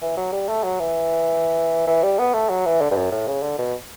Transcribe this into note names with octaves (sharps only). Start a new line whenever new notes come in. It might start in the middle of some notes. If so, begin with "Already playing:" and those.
E3
F#3
G3
A3
F#3
E3
E3
G3
B3
A3
F#3
E3
D3
G2
F#2
A2
C#3
D3
B2